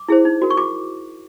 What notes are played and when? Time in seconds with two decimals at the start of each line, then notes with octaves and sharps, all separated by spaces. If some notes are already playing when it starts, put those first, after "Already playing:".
Already playing: D6
0.08 E4 G#4 C5
0.25 D#4
0.42 F#4 A#4
0.50 C#6
0.57 F#4 D6